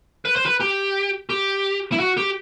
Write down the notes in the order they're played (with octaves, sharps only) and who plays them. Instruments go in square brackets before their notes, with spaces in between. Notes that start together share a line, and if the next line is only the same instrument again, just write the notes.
[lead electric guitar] B4
C5
B4
G4
G4
E4
F#4
G4